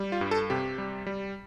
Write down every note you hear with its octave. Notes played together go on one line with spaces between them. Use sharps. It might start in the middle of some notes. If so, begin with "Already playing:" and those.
Already playing: G3
F4
G2
A4
C3 G4
G3
G3